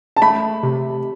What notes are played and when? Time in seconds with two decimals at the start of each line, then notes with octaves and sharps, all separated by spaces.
0.17 A5
0.22 A3 B5
0.63 C3